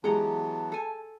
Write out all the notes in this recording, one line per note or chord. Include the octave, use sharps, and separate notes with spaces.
E3 F#3 G#3 B3 G4 F#5 A5 A#5
A4 G#5